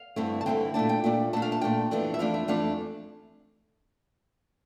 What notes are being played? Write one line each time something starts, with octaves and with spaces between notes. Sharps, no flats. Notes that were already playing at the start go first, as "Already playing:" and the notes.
Already playing: F5
G2 D3 A3 C4 E4
A5
G2 D3 A3 C4 E4 G5
A#2 A3 D4 A5
G5
A#2 A3 D4
A#2 A3 D4 A5
F5
A5
A#2 A3 D4 G5
F2 E3 A3 D4
E5
F2 E3 A3 D4 F5
E5
F2 E3 A3 D4 F5